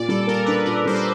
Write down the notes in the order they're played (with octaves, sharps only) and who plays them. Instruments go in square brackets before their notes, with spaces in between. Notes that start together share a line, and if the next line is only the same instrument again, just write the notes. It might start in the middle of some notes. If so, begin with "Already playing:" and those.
Already playing: [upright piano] A#2 [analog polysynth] D5
[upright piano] G3 [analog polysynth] A4
[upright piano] A#3 [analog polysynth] A#4
[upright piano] D4 [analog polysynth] B4
[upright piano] A#2 [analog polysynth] A#4
[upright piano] G3 [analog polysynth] C5
[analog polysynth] B4